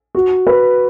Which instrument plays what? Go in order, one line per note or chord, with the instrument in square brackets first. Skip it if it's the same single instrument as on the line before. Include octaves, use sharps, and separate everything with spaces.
[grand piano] F#4
B4